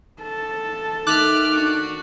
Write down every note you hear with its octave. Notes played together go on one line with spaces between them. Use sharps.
A4 A5
D#3 A3 D6 F6 F#6
D4 F#4